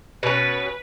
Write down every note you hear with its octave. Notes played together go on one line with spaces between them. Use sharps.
B2 C#4 B4